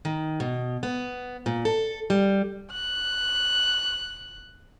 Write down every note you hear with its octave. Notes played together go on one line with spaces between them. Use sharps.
D#3
B2
B3
A#2
A4
G3
D#1 F#6